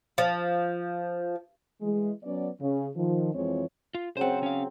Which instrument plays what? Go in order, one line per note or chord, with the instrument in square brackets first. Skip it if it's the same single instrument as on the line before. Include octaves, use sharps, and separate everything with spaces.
[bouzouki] F3
[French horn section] E3 G#3
F#3 B3 C#4 D5
C#3
D#3 F3
F2 E3 F3 G#3 C4 C#5
[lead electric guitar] F4
[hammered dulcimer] C#3 F#3 C4 [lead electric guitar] C5 F#5
[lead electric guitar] C#4 F5